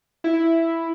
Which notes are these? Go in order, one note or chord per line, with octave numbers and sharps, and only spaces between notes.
E4